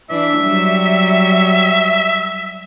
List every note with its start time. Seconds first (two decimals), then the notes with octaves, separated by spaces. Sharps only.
0.10 E3 D4 E5
0.41 F#3 G3